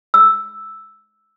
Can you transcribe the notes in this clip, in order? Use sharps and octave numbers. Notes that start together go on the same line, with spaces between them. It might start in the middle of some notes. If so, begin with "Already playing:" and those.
E6